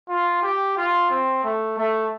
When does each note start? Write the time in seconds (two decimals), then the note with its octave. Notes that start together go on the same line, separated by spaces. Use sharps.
0.09 F4
0.43 G4
0.77 F4
1.10 C4
1.43 A3
1.78 A3